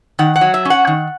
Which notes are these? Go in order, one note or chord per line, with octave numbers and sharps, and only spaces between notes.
D#3 F#5
F#5
F#3
E5
C#4 F#5
D#3